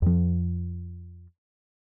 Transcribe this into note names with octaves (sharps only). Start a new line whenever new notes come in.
F2 F3